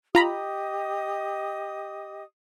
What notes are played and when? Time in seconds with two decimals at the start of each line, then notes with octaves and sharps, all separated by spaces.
0.15 F4 G4 D#5 A#5 B5 D#6